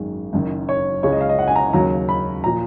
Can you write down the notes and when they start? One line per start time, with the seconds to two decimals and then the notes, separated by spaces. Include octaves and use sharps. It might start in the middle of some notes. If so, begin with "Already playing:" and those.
Already playing: G#1 F#2 D#3 G#3
0.33 F#1 F#2 D#3
0.69 C#5
1.03 C#2 C#3 G#3 C#5
1.12 D#5
1.21 F5
1.29 D#5
1.39 F#5
1.48 G#5
1.56 A#5
1.73 D#2 C#3 F#3 A#5
2.09 B5
2.44 A#2 F3 A#5